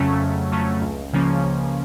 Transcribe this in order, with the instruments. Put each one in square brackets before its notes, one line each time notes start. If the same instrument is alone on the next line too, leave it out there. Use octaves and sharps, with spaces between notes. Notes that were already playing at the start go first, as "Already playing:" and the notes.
Already playing: [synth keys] F2 C#3 F#3 A3 C#4
F2
C#3 F#3 A3 C#4
C#2
C#3 F3 A#3 C#4
C#2